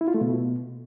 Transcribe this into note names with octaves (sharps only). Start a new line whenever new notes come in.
E4
F4
A3
B2